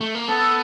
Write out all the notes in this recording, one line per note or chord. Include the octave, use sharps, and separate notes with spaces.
A3
A#3
B3 A4